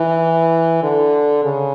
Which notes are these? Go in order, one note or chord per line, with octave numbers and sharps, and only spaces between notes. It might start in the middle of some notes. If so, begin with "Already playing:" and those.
Already playing: E3
D3
C#3